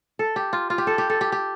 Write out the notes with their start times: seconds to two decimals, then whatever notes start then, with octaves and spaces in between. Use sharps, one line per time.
0.19 A4
0.36 G4
0.53 F4
0.70 F4
0.78 G4
0.87 A4
0.98 G4
1.10 A4
1.21 G4
1.32 G4